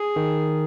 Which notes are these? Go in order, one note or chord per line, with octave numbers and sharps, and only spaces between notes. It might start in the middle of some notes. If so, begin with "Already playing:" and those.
Already playing: G#4
D#3